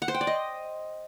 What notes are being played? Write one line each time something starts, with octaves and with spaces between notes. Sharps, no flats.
F#5
C5
G5
D5
D#5